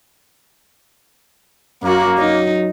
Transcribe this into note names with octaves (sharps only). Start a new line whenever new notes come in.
F#2 A#3 F#4
F#3 D#4